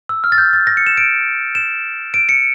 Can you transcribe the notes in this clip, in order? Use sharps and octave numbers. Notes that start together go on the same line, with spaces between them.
E6
F6
A6
G6
A6
A#6
C#7
E7
D7
E7
D7
C#7